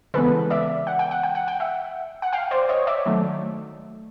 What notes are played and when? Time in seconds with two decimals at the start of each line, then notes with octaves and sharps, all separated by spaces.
0.14 C#3 E3 G#3 B3 A4 B4
0.50 D5 E5
0.87 F#5
0.99 G5
1.11 F#5
1.23 G5
1.35 F#5
1.48 G5
1.60 E5 F#5
2.22 F#5
2.33 F5 G5
2.51 C5 D5
2.69 C#5 D#5
2.87 D5 E5
3.06 D#3 F#3 A3